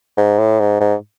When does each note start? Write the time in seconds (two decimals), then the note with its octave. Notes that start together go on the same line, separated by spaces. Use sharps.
0.17 G#2
0.39 A2
0.60 G#2
0.80 G#2